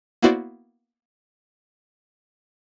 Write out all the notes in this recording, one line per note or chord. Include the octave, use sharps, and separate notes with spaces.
A#3 B3 E4 F#4 C5 D5